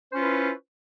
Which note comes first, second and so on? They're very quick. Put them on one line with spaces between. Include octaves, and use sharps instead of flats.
C5 C#4 F4 B4 E4